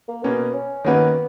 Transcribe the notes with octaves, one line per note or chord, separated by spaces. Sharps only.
A#3
B2 A#3 B3 C#4
C#4
D#3 A#3 B3 C#4 F#4 B4